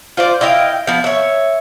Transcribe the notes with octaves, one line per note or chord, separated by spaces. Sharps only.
F4 C5 D5
E4 D#5 F5 G5
F3 B3
C#5 E5